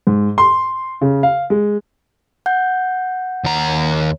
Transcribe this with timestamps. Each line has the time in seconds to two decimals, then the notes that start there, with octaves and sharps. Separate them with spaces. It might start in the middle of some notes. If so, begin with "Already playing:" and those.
0.07 G#2
0.38 C6
1.01 C#3
1.23 F5
1.50 G#3
2.46 F#5 G6
3.44 D#2 A#5